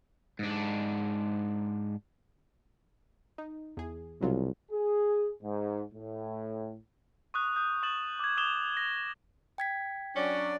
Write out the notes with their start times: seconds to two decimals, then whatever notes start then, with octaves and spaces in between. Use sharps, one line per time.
0.39 G#2 D4
3.38 D#4
3.77 E2 G#4
4.21 C2 B2 F#3 F4
4.72 G#4
5.43 G#2
5.95 A2
7.34 C#6 D#6 F#6
7.56 D#6 G6
7.83 C#6 D#6 A6 E7 F#7
8.19 D6 G#6
8.37 D6 D#6 E7 F7 G7
8.77 A#6
9.58 G5 G#6 B6
10.16 F#3 C#4 D4 D5